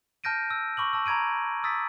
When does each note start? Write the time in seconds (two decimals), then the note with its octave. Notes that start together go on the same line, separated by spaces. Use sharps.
0.24 A5 F6 G6 A#6 D7 D#7
0.51 E6
0.77 B5 C#6 D6 F#7
0.93 A5 E6
1.06 A#5 B5 G#6 D7 D#7
1.64 D#6 E6 A6 B6